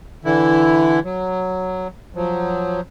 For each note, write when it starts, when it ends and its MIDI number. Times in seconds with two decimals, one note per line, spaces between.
0.25 1.00 50
0.25 1.00 52
0.25 1.00 64
1.04 1.88 54
2.15 2.80 53
2.15 2.80 54